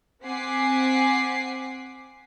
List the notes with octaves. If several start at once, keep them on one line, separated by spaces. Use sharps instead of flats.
C4 F#5 G#5 D6 B6 C7